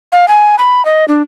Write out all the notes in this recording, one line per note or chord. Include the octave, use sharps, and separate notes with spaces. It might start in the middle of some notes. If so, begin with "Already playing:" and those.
F5
G#5
B5
D#5
D4